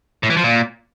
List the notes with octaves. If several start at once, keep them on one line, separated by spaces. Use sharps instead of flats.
A2
E3
F3
A#2